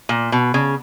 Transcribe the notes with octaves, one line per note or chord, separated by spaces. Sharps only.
A#2
B2
C#3